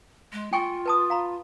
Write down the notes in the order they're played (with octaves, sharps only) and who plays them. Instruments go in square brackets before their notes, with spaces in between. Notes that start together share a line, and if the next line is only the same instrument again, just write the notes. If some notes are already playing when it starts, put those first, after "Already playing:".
[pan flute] G#3
[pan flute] F4 [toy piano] G5 G#5 C#6
[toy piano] B4 A5 D#6
F5 A#5 B5